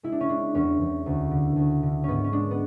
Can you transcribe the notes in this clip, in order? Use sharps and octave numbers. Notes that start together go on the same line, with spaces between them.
G#3 E4
D4
C#4
G#3 D4
E2 C#4
E2
D2
D3
D2
D3
G#2 B3 C#4
C#4
G#3 D4
B3